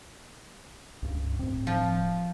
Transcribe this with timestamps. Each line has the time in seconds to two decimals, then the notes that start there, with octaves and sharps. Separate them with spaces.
1.02 C#2 G2
1.39 D1 A2 C4
1.67 F3